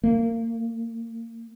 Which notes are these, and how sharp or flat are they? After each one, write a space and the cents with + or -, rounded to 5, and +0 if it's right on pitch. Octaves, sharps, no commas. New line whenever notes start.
A#3 -30